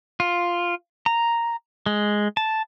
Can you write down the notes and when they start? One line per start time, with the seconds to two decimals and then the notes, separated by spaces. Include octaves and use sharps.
0.20 F4
1.06 A#5
1.86 G#3
2.37 A5